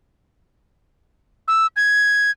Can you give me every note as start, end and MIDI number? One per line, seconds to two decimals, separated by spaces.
1.48 1.67 88
1.76 2.31 92